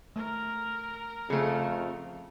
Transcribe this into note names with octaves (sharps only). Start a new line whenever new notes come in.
A3 A#4
F2 C#3 A3 G#4